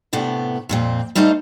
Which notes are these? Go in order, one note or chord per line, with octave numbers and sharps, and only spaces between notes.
A2 C3 A3 B3 D4
F2 A#2 C4
G3 A3 D#4 C5 D#5 F5